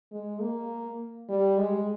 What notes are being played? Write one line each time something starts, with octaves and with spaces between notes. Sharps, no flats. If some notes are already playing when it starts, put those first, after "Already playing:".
G#3
A#3
G3
G#3